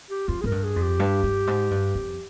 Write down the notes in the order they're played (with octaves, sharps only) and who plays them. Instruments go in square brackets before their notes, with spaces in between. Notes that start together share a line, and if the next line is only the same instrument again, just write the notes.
[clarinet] G4
[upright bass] F2 [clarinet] F4
[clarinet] G#4
[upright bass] G#2 [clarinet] A#4
[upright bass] G2
[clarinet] G#4
[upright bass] F2
[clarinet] G4
[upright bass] G2
G2
G#2
G2
F2